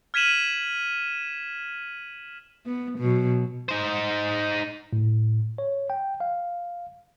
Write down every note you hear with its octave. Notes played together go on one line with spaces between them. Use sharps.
F6 G#6 B6 D#7 E7 F#7
B3
B2 F#3
D#4 C5
A2
C#5
G5
F5